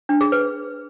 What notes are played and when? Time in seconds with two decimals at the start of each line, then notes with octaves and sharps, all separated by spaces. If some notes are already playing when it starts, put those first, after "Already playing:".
0.09 D4
0.21 G#4
0.32 B4